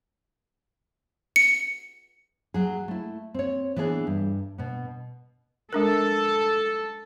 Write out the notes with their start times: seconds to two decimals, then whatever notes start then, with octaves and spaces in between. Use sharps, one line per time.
1.36 C#7
2.54 F#3 G#4
2.88 A3 E4
3.34 C4 C#5
3.76 E3 B3 D4 G#4
4.07 G2
4.58 B2 B3
5.73 G#3 D4 A4 A#4